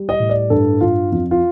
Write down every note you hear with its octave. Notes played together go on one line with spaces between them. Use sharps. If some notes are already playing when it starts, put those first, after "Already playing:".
Already playing: G3
D#5
A2
D5
G2 A4
G2 F4
F2 F4
F4